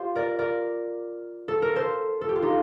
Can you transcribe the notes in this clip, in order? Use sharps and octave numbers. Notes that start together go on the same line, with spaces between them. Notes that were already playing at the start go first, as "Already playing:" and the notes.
Already playing: F4 G4 C5
A#4 D5
A#4 D5
A4
A#4
A4 C5
A4
G4
F4
D#4 G4